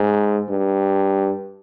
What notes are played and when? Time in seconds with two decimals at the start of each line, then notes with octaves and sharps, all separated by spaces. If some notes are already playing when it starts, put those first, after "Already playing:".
Already playing: G#2
0.49 G2